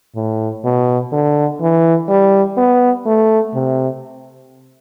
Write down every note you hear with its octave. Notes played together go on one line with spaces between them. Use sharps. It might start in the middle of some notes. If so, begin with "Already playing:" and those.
A2
B2
D3
E3
G3
B3
A3
C3